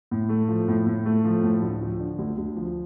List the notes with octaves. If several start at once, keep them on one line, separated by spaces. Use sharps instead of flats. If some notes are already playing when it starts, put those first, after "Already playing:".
A2
A3
F3
A2
A2
A3
F3
A2
D2
F3
D3
D2
D2
F3